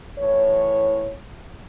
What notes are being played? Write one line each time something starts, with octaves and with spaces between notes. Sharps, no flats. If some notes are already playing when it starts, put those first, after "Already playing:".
A2 E3 C#5